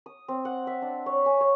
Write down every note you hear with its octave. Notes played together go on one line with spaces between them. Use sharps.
D#6
C4
F#5
E5
D4
C#5
G#5
C#5